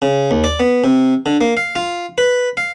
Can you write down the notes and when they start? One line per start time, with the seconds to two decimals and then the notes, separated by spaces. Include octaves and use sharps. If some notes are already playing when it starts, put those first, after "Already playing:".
0.02 C#3
0.31 D#2
0.44 D5
0.60 B3
0.84 C3
1.26 D3
1.41 A#3
1.57 F5
1.76 F4
2.18 B4
2.57 F5